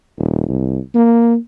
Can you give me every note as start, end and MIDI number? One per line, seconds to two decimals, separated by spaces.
0.18 0.46 27
0.48 0.79 36
0.94 1.36 58